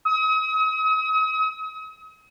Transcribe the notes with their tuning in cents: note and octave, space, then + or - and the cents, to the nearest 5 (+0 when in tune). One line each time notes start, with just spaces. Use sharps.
D#6 +40